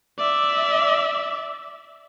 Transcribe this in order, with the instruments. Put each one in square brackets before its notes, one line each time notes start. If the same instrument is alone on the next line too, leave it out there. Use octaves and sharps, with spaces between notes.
[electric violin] D5 E5